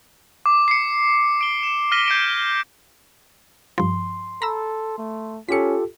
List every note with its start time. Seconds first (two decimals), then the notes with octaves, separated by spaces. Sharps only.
0.46 D6
0.68 C7 C#7
1.41 D7 G7
1.63 C#7 E7
1.92 F6 A#6 B6 D#7 G7
2.08 G6 G#6 C7 D7
3.78 G2 F3 C6
4.42 A4 A#5 B5 E6
4.98 A3
5.49 C#4 F4 G4 A4 B6 C#7